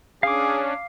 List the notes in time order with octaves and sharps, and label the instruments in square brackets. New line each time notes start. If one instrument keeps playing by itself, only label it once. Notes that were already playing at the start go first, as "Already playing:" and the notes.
[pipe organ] C#4 D4 [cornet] G#4 [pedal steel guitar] F5 D6